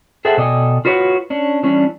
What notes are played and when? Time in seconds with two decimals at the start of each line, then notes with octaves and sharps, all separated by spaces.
0.25 G#4 A4 C5 E5 F#5 G5
0.38 B2 A4 D5 D#5 G5 G#5
0.85 F4 F#4 B4 C#5 F5 F#5
1.30 C#4 D4
1.63 E3 G3 C#4 D4